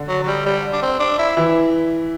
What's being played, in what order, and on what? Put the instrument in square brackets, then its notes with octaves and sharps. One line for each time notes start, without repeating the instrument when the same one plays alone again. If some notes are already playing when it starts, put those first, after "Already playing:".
Already playing: [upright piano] D3
[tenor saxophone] F#3
F#3
G3
G3
D4
C4
D4
E4
[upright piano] E3 [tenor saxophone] E4